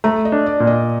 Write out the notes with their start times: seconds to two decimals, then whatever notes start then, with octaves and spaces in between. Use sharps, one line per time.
0.04 A3 A#5
0.25 D#5
0.32 D4
0.46 D5
0.60 A#2
0.67 D#5